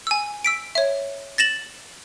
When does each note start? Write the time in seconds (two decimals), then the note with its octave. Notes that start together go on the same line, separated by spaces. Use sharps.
0.07 G#5 E6
0.44 E6 B6 D7
0.75 C#5 E5
1.38 A6 A#6 E7 F#7